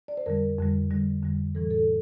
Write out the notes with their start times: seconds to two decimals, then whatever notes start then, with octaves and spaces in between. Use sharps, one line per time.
0.08 D5
0.17 C5
0.26 F2 D3 G3 A#4
0.58 F2 D3 G3
0.91 F2 D3 G3
1.23 F2 D3 G3
1.55 A2 E3 G3 A4
1.71 A4